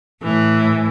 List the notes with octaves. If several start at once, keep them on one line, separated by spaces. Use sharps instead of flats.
A2 E3